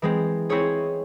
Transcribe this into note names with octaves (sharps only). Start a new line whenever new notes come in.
E3 G#3 C4
C4 E4 G#4 C#5